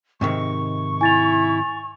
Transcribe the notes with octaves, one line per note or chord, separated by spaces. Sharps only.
G#2 C3 D#3 C#6
E4 G#5 A6 F7